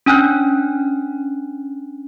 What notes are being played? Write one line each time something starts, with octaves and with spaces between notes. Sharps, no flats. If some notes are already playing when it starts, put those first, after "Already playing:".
C#4 D4 G#5 F6 F#6